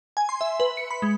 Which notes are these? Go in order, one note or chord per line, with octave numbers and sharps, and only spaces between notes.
G#5
C6
E5
B4
C#7
B5
G#3